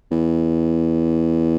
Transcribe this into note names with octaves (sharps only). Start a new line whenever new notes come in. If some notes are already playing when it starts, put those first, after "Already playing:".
E2